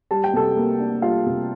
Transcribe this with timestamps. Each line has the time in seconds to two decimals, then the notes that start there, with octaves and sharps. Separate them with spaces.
0.11 G3 A5
0.24 G5
0.33 C3 A4 A5
0.57 A#3
0.80 D4
1.02 G3 F4 F5
1.26 C3